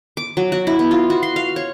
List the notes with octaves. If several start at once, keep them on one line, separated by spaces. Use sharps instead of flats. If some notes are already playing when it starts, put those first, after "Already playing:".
D6
F#3
F#4
E4
B3
F4
F#4
C6
F5
C#5